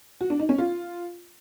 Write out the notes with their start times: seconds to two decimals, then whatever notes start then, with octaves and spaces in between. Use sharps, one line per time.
0.21 F#4
0.30 D4
0.40 D#4
0.49 C#4
0.58 F4